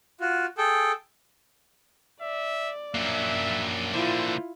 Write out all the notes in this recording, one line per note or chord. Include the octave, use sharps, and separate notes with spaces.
F4 F#4
G#4 A4 G5
D5 E5
F#2 F#3 A#3 D4 E5
D3 E4 F4 C5